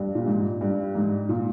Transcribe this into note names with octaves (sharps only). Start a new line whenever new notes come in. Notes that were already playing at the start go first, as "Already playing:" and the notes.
Already playing: G2
A#2
G#2
G2
G#2
A#2